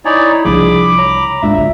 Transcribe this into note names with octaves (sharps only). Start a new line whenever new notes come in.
D#4 E4 C#5 D5 G#5
C2 F3 G3 D4 G#4 B5 D6
C#5 A#5
G#2 G#3 A3 D4 F4 E5
B1 D3 E5